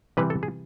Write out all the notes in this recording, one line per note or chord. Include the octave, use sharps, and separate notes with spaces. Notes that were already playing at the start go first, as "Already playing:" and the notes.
C3 E3 G3 B4
A4
G#4